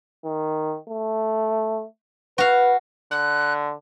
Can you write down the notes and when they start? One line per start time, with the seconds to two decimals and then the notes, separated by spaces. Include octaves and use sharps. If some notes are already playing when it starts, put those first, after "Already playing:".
0.25 D#3
0.89 A3
2.38 F#4 B4 F5
3.11 D3 F#6